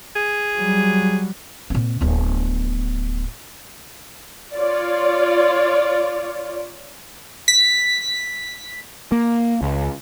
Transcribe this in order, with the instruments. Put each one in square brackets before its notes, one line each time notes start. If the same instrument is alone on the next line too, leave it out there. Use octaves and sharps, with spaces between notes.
[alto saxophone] G#4
[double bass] F#3 G3
[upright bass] A#2 C4
D1 B3
[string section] F4 C#5 D5
[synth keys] B6
[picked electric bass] A#3
C#2